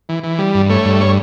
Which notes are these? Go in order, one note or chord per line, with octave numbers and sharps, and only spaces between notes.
E3
E3
G3
G2
A3 C#5
G2
C#5